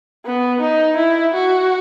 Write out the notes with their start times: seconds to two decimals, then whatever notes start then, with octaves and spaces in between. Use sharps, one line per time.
0.25 B3
0.60 D#4
0.97 E4
1.34 F#4